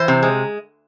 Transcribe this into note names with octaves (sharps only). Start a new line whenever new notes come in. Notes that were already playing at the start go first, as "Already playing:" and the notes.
Already playing: E3 C5
C3
G#3